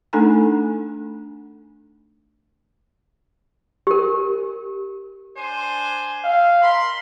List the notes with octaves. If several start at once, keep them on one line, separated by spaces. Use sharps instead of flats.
A3 D4 D#4 A4 G#5 A#5
G4 A#4
D4 C5 G#5
F5
A#4 B5 C6